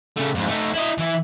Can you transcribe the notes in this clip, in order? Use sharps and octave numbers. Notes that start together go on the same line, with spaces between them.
C#3 A3
F2 G#2
A3 D#4
E4 D#5
E3 E4